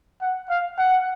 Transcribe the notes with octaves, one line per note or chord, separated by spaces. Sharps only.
F#5
F5
F#5